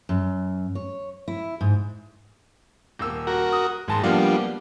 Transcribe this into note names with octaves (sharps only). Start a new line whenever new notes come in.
F#2
C#5
E4
G#2
D#1 A#3 E6
F#4 A#4
D#6
F#1 G#2 A5 C6
F3 G3 A#3 B3 D4 F5